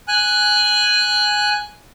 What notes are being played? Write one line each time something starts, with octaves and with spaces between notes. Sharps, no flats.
G#5 F#6